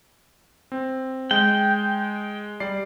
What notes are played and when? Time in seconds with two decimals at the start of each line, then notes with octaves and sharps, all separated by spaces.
0.72 C4
1.31 G#3 G5
2.60 G3 D5 C7